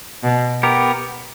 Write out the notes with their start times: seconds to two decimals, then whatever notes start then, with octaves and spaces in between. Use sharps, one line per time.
0.24 B2
0.63 B3 G4 A#4